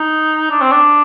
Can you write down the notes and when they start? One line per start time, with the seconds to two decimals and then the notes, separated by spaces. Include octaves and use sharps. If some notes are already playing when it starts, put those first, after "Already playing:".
Already playing: D#4
0.50 D4
0.61 C4
0.71 D4